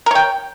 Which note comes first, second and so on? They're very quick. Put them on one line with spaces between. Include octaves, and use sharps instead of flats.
A#4 C#5 G5